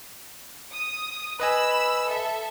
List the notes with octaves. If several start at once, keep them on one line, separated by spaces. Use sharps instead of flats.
D#6
B4 D#5 G#5 B5 E6
A4 E5